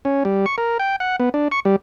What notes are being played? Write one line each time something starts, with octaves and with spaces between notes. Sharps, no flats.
C#4
G3
C#6
A#4
G5
F#5
B3
D4
C#6
G3